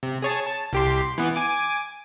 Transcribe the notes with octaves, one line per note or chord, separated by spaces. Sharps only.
C3
G#4 C#5 A5
A5
C2 G4 C6
E3 B3
G#5 D6